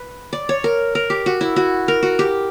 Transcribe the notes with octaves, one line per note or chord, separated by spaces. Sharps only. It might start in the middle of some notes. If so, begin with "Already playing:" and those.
Already playing: B4
D5
C#5
A#4
A#4
G4
F#4
E4
F#4
A#4
F#4
G4